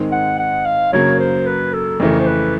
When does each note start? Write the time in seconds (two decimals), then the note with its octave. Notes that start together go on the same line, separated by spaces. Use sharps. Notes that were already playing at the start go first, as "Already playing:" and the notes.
Already playing: G#2 D#3 G#3 C4
0.12 F#5
0.39 F#5
0.66 F5
0.93 F#2 C#3 F#3 A#3 C#5
1.20 C5
1.47 B4
1.74 A4
2.00 F2 C#3 E3 A3 A#4
2.20 C5
2.27 B4